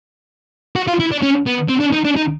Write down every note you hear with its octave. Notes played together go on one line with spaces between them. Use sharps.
F#4
F4
E4
D4
C#4
B3
C4
D4
D#4
D4
D#4